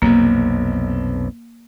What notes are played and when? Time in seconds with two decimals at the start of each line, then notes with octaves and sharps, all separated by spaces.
0.02 B1 F2 C3 A#3